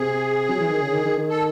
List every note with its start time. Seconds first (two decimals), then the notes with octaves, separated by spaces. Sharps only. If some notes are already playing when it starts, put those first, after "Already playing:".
Already playing: C3 G#4
0.50 F#3
0.60 E3
0.71 D#3
0.82 C#3
0.93 D#3
1.05 D#3
1.17 D#3
1.29 A4